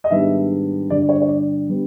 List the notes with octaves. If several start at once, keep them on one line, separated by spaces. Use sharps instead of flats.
D#5
G#2 D#3 G3 B3 D4 E5
G2 D3 G3 D5
C#5
C#5
D5
D3 G3 B3